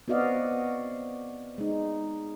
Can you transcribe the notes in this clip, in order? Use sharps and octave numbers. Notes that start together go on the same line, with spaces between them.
B3 C4 F#4 D5 D#5 F5
G#3 D#4